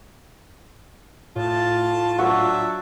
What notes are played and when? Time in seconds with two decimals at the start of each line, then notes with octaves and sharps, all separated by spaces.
1.36 A2 F4 A5
2.19 F#3 D4 F#4 C#5 E5